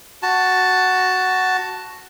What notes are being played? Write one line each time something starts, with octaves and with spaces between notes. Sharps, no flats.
F#4 A5